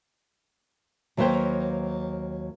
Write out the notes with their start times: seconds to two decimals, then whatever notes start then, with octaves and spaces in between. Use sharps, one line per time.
1.17 D#2 F#3 A#3 B4 C5 G5